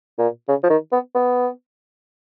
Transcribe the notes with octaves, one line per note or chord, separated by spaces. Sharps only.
A#2
C#3
F3
D#3
B3
B3